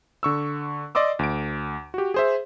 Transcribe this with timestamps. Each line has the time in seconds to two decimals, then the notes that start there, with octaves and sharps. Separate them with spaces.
0.23 D3 C#6 E6
0.95 D5 D#5 C6 D6 E6
1.19 D2 D7
1.94 F#4 G4
2.14 G#4 C5 E5